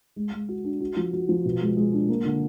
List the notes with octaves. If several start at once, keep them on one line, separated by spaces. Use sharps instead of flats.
G#3
G#3
F#4
D4
F#4
F3
F#4
F3
B2
G#3
G#3
D4
A#3
D3